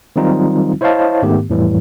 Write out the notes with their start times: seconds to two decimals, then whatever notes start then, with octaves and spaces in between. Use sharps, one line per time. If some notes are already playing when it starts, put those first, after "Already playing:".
0.16 D#3 F#3 G3 C4 D#4 F4
0.81 E4 C5 C#5 D#5 F5 A5
1.22 G#2 D#3 A3 B3 G4
1.50 F2 A2 E3 G3